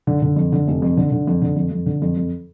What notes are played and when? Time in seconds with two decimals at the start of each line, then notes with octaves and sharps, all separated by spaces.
0.07 D3
0.22 D3
0.36 F2
0.52 D3
0.68 F1
0.82 F2
0.97 D3
1.12 D3
1.27 F2
1.42 D3
1.56 F2
1.71 F2
1.86 D3
2.02 F2
2.17 F2